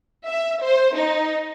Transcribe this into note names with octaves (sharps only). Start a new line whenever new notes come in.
E5
C5
D#4